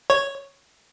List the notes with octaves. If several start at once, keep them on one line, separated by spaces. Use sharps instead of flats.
C#5